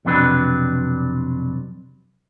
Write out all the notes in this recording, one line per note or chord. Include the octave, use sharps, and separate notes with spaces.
B1 F2 C3 F#3 D4 B4